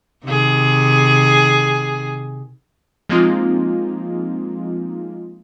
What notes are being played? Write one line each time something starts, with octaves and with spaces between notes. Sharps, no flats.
C3 D#3 G#4
F3 G#3 A#3 C4 D#4 F4